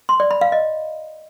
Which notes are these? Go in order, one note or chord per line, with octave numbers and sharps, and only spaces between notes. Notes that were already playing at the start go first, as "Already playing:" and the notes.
C6
D5
B5
F5
D#5